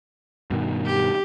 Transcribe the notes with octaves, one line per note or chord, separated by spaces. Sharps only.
G2 B2 D#3
G4